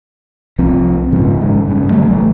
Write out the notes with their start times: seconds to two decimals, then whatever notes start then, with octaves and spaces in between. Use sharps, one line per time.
0.59 C2 F3 C4
1.12 G#2 C#3 F3
1.40 G#1 G#2 C#3
1.68 G2 C#3
1.90 D3 F#3 G3 A3
2.10 A1 E3 A3